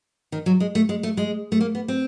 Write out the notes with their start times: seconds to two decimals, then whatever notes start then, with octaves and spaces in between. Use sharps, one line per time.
0.32 D#3
0.46 F#3
0.60 G#3
0.75 A3
0.89 G#3
1.03 A3
1.17 G#3
1.52 A3
1.61 A#3
1.75 B3
1.88 C4